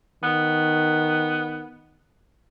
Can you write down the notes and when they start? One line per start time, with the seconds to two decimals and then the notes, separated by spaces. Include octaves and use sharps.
0.23 D#3 B3